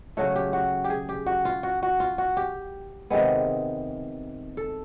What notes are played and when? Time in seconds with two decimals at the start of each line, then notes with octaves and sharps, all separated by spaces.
0.17 C#3 F#3 A3 F#4
0.36 G4
0.53 F#4
0.84 G4
0.90 G#4
1.09 G4
1.26 F#4
1.45 F4
1.63 F#4
1.83 F#4
2.00 F4
2.18 F#4
2.37 G4
3.10 C3 D#3 G#3 B3
4.57 A4